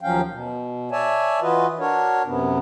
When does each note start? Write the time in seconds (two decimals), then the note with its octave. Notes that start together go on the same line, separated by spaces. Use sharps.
0.01 D#2 F3 F#3 C#4 F5 G5
0.31 B2
0.92 C#5 D5 E5 G#5 A5
1.41 E3 F4 F#4 B4 D#5
1.79 D4 F#4 A#4 C#5
2.25 F#2 C3 B3